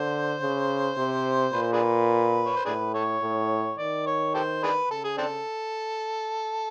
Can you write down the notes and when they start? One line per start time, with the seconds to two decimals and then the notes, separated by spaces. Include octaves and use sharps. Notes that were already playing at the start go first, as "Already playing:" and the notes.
Already playing: D3 C5
0.41 C#3
0.97 C3
1.53 A#2 B4
1.63 C5
1.73 D4 G#4 B4
2.46 C#5
2.56 C5
2.65 A2 D4 G#4 B4
2.94 A4 C#5
3.22 A2
3.78 D#3 D5
4.06 C#5
4.35 G4 A4 C5
4.63 D4 G#4 B4
4.91 C#3 A4
5.04 G#4
5.18 C4 D4 A4